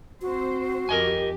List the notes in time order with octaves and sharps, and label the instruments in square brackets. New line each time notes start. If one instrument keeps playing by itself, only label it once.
[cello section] C4 C5 [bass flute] F#4
[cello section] F2 G4 [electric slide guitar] A#4 D#5 G#5